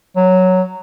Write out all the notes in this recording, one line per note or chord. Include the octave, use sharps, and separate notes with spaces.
F#3